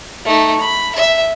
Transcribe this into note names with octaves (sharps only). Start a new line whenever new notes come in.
A3 D#4
B5
E5